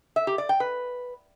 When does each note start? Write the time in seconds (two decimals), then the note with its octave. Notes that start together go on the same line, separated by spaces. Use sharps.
0.16 E5
0.27 G4
0.38 D5
0.49 G5
0.60 B4